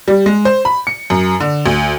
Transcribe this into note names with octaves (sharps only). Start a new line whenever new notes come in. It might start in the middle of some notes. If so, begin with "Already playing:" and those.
G3
G#3
C5
B5
C#7
F#2
D3
D2